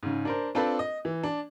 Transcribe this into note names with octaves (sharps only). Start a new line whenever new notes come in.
G#2 C#3
D4 A#4 C5
C4 D4 F4 A4 B4 C5
D#5
E3
D4